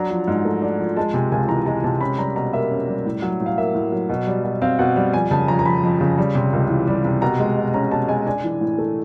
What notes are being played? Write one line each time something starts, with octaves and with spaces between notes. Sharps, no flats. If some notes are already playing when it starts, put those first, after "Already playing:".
Already playing: F#3 D4 A#5
F3
G#2
A3
D4
F3
G#3 A5
C3 G#5
C#2 G#5
E3 A#5
G#3 A#5
C3 A5
C#4 B5
G3 A#5
B2 A#5
A#3 E5
C#4
G3
A2
F#3
A2
F5
A#3 E5
A2
F#3
B2
G3
B2
C4 F5
B2 F#5
G3
F2 G#5
C#3 A5
F2 A#5
A#5
F3 B5
F2
C#3
G3
C3
C#2
E3
G3
C3
B2 A#5
G#3
B2
C#4 A#5
B2 A5
G#3 G#5
D4 G#5
E3
A2
A3